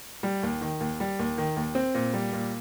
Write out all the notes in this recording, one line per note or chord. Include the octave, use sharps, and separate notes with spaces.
G3
D#2
D#3
D#2
G3
D#2
D#3
D#2
C4
A#2
G3
A#2